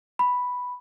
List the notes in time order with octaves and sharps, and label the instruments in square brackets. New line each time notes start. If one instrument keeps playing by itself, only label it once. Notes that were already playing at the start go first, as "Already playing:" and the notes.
[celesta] B5